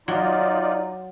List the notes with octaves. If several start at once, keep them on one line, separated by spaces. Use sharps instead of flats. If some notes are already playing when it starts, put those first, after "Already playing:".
F#3 D#4 F4 D5